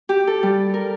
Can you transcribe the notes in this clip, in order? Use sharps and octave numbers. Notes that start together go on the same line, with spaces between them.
G4
A4
G3
A#4